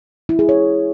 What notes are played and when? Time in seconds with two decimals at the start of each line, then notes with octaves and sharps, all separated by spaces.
0.29 E4
0.39 G#4
0.49 C#5